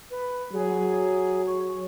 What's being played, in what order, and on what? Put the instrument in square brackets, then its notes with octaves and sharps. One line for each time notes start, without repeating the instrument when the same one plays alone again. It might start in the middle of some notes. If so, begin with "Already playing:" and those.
[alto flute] B4
[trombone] F#3 [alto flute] G#4
[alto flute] C#5